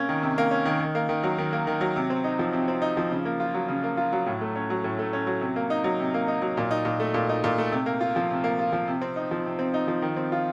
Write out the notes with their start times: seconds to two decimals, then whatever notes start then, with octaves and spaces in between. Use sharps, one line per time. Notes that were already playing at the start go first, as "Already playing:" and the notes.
Already playing: C3 A#3 C#4
0.09 D#3
0.23 C3
0.38 A#3
0.51 C#4
0.65 D#3
0.80 D#3
0.95 A#3
1.09 D#3
1.23 F#3
1.38 D#3
1.53 A#3
1.67 D#3
1.81 F#3
1.96 C3
2.10 C4
2.24 D#4
2.39 F3
2.53 C3
2.68 C4
2.82 D#4
2.97 F3
3.12 C#3
3.25 A#3
3.40 F4
3.54 F#3
3.68 C#3
3.84 A#3
3.97 F4
4.12 F#3
4.26 A2
4.41 A3
4.56 C#4
4.70 F#3
4.84 A2
4.99 A3
5.13 C#4
5.27 F#3
5.41 C3
5.56 A#3
5.70 D#4
5.84 F#3
6.00 C3
6.14 A#3
6.28 D#4
6.42 F#3
6.57 A#2
6.71 D#4
6.85 A#2
7.00 A3
7.14 A#2
7.29 D#4
7.44 A#2
7.58 A3
7.72 C3
7.86 A#3
8.01 F4
8.16 F3
8.30 C3
8.44 A#3
8.59 F4
8.72 F3
8.88 C3
9.02 C4
9.16 D#4
9.31 F3
9.46 C3
9.59 C4
9.74 D#4
9.88 F3
10.02 D#3
10.16 C4
10.32 F4